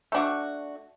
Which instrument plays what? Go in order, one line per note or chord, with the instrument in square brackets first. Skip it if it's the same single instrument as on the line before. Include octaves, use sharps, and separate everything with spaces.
[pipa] A3 D4 F#4